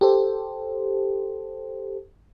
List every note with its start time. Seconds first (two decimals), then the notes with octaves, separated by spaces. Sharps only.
0.01 G4 A4 C5